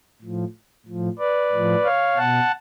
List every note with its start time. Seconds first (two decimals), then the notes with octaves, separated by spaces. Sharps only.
0.22 A2 F3
0.86 A2 F3
1.19 B4 D5
1.52 A2 F3
1.84 C#5 F5
2.17 B2 F#5 A5